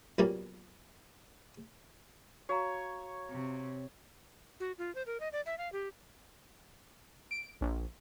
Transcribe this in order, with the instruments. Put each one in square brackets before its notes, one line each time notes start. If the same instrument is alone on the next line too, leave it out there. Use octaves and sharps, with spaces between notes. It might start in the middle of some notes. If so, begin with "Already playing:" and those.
[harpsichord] B1 A#2 G3 A#3 C#4 F#4
[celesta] F#4 F5 A#5 [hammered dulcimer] C#5
[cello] C3
[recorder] F#4
F4
C5
A#4
D#5
D5
E5
F5
G4
[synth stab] D7
A#1